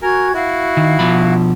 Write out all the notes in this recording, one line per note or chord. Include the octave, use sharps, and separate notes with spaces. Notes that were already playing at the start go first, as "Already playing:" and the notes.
F#4 A#4 G#5 G#6
E4 F#4 F5 F#5
D#3
B2 F3 B5